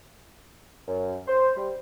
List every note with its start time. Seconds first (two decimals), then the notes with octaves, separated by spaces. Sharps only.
0.88 F#2
1.27 C5
1.56 G3